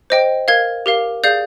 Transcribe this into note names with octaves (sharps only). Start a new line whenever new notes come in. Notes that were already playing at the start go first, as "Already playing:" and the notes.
C5 D#5 G5
A#4 F5 G#6
G4 A#4 F5
G#4 D5 F5 G6